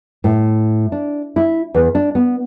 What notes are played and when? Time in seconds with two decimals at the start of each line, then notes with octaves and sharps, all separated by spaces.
0.24 A2
0.92 D4
1.36 E4
1.74 E2
1.95 D4
2.15 B3